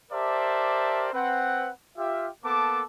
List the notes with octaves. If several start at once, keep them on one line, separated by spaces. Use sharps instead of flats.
G4 A#4 C5 D5 E5 A5
C4 B4 F#5
F4 G4 E5
A#3 B3 A4 A5 D6